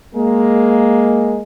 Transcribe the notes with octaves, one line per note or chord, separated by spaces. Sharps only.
G#3 A#3